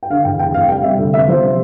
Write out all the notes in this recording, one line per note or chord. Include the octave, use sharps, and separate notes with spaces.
G5
D3 F5
E2 G5
F1 G5
F1 F5
G3 G5
C3 E5
D2
B3 E5
F3 C5
C3